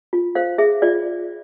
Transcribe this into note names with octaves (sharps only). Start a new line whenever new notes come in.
F4
C5 F5
G#4 E5
F4 D5